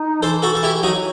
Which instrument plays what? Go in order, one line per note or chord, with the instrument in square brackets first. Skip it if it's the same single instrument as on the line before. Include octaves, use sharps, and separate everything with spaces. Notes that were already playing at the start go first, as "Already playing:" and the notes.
Already playing: [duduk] D#4
[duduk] E3 [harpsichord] A4 C5
[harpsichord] F#4 A4
A4
E4 G4
[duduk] F#3 [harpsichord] D#4 F#4